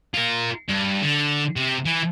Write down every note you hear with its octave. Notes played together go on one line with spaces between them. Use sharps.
F4 A#4
G2
D3
C3
E3